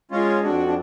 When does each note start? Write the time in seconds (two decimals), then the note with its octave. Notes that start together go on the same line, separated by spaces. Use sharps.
0.11 G#3 C#4 F4
0.43 F2 D4 F#4
0.67 D4